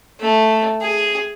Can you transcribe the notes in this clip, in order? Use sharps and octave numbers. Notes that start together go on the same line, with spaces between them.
A3
G#4